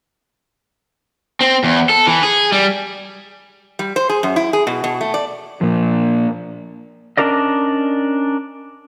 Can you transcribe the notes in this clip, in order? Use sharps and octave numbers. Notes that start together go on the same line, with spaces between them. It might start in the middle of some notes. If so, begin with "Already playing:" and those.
C4
E2
A4
E3
G#4
G3
G3
C5
G#4
F#2
E4
G#4
B2
B2
A3
D5
A#2 F3
C#4 D4 E4 A#4 D5 D#5